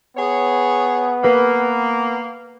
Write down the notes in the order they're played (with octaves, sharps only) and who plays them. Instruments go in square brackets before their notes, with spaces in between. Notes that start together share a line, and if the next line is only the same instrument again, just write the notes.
[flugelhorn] B3 [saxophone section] G#4 C#5
[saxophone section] A#3 [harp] B4